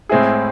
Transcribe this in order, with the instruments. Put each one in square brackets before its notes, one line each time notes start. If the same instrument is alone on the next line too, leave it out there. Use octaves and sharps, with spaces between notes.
[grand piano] A2 G#3 C4 E4 G#4